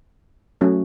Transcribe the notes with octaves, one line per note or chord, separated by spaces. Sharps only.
F#3 A3 C#4 F#4